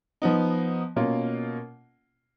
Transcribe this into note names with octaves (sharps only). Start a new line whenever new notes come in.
F3 B3 D#4
B2 A#3 C#4 F4